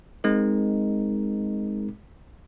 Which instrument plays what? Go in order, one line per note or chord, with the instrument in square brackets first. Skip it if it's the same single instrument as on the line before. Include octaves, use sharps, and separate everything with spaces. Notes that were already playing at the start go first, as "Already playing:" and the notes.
[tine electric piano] G#3 C4 D#4 A#4